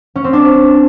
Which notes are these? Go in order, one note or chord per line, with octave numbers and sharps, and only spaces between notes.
C#4
C4
D4